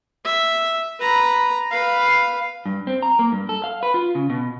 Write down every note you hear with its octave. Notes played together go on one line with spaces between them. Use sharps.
E5
B4 A#5
B4 F5
G2
C4
A#5
A#3
G2
A4
F5
B4
F4
C#3
B2